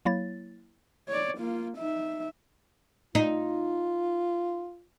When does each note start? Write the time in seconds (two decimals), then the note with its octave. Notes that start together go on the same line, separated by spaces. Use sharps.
0.05 F#3 A#3 E4 C#5 A6
1.08 C#5 D5
1.38 A#3 F4
1.78 D#4 E5
3.15 D#4 F4